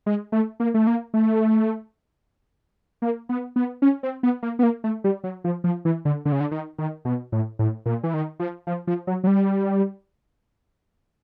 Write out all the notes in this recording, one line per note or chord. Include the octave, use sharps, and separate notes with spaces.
G#3
A3
A#3
A3
A#3
A3
A#3
B3
B3
C#4
C4
B3
A#3
B3
A#3
A3
G3
F#3
F3
F3
E3
D3
D3
C#3
D3
D#3
D#3
B2
A2
A2
A#2
E3
D#3
F3
F3
F3
F#3
F#3
G3